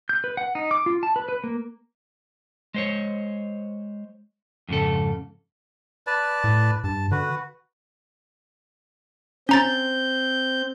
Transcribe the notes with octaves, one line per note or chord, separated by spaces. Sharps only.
G6
B4
F#5
D#4
D6
F4
A5
B4
B4
A#3
G#3 C5 C#5
F2 G#2 C#3 A4
B4 D5 A5
A2
G2 A5
D3 F#4 B4
C4 C#4 A#5 G6 A6